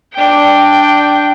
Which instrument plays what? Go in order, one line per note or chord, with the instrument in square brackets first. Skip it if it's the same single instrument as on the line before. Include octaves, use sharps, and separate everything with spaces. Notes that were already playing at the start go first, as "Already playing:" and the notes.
[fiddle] D4 G5